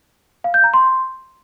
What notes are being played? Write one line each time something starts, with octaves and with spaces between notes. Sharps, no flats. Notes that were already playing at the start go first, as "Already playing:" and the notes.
F5
G6
A#5
C6